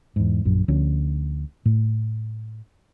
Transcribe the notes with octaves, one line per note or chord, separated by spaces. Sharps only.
E2 G#2
A#1 F#2
D2 F3 C#4 D4
A2